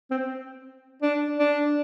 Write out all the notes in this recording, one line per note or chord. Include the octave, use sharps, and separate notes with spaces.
C4
D4
D4